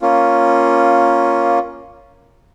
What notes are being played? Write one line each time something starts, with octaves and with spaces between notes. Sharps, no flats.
A#3 C#4 F4